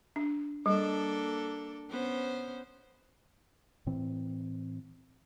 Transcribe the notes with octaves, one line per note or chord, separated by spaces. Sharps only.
D4
G3 A#3 D4 A4
B3 C#4 C5
A2 E3 C4